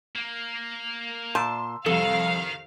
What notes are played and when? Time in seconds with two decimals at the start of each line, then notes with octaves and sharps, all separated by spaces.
0.16 A#3
1.35 A#2 A5 C6 E6
1.86 C2 F2 D#3 A4 F5